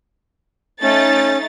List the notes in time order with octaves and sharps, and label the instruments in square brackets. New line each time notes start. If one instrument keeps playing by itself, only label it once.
[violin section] A3 D#4 A6 [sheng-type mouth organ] C#4